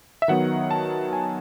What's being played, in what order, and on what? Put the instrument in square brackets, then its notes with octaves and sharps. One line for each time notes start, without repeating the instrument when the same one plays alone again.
[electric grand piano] E5
D#3 F#3 B3 D#4 F#5
A5
G#5